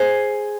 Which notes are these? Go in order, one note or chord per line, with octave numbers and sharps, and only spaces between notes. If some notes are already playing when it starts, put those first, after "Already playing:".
Already playing: G#4 C5